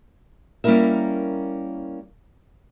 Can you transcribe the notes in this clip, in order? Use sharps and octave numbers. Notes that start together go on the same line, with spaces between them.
G3 A#3 C#4 E4 A#4 E5